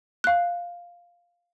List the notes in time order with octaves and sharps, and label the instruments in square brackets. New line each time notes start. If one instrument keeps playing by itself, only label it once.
[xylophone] F5 F#6